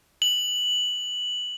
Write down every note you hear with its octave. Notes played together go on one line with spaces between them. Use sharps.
F#7